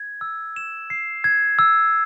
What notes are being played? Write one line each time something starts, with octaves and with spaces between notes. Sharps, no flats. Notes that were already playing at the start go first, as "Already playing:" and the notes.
Already playing: G#6
E6
E7
C7
G#6
E6